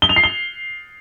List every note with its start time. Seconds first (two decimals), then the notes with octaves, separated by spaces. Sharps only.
0.02 G7
0.09 F7
0.16 C7
0.24 G7